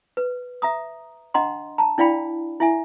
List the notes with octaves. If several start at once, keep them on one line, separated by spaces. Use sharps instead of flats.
B4
E5 A#5 D#6
D4 D#5 F#5 A#5 C6
A5 A#5
D4 E4 D5 F5 G5 B5
E4 E5 G#5